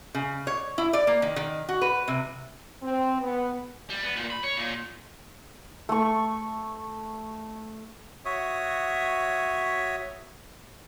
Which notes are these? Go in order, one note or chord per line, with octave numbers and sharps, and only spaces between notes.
C#3
C#5
E4
D5
A#3
D#3
D#3
F#4
B4
C3
C4
B3
G3
B3
A#2
B5
C#5
A#2
A3 C#6
F#4 C#5 E5 D#6